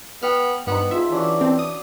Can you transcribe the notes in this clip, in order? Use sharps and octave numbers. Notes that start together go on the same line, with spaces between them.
B3 F#5 G5 F6
G2 B3 D#4 C5 F#5
F4 G#4 E5
E3 C#4 D4 F#4
C4 E5 A5
D#6